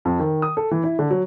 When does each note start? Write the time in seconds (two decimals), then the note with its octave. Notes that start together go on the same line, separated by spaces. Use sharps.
0.05 F2
0.19 D#3
0.42 D#6
0.57 A4
0.71 E3
0.84 E4
0.99 D3
1.11 F#3